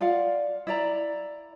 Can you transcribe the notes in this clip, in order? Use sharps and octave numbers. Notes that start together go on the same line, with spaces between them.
F4 D5 F5 F#5
E4 D5 A#5